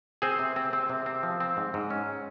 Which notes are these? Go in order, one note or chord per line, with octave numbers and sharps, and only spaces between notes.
C4 G#4 C5
C3
C4
C4
C3
C4
F3
C4
G#2
G#2
C#4